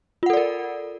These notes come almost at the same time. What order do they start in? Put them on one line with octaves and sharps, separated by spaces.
F4 F#5 A4 D5 A#4